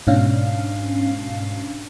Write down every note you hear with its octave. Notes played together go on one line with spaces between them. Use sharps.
G#2 B2 C#4 D4 F5